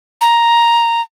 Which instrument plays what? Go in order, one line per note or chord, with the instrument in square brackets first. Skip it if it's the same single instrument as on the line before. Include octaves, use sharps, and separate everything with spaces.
[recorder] A#5